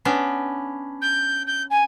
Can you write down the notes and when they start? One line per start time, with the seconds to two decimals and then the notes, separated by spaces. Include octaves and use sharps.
0.05 B3 C#4 D4
1.01 G6
1.47 G6
1.70 G#5